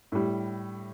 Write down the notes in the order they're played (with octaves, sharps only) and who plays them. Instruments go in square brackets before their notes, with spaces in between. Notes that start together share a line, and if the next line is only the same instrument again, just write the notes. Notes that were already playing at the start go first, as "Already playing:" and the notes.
[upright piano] A2 G3